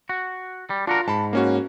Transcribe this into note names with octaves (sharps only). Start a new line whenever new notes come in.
F#4
G3
D4 F4 F#4 A#4
G#2 A5 B5
A#3 C#4 F#4